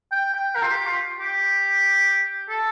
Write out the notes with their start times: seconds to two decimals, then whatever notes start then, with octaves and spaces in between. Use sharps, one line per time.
0.12 G5
0.34 G5
0.56 A#4
0.63 F4
0.71 G4
0.87 F4
1.20 G4
2.49 A4